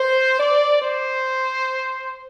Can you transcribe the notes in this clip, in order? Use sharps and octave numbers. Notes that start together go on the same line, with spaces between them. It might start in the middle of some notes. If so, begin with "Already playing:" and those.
Already playing: C5
D5
C5